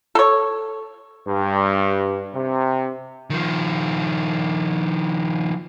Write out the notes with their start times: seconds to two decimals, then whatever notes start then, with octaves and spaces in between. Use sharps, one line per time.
0.15 A4 C#5
1.28 G2
2.34 C3
3.30 D#3 F3